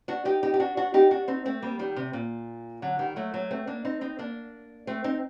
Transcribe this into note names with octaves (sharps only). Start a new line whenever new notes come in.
D4 F#4
D#4 G4
D#4 G4
G4
D4 F#4
D4 F#4
D#4 G4
D4 F#4
C4 D#4
A3 C4
G3 A#3
D#3 G3
C3
A#2
D3 F#3
D#3 G3
F#3 A3
F#3 A3
A3 C4
A#3 D4
C4 D#4
C4 D#4
A#3 D4
A3 C4
C4 D#4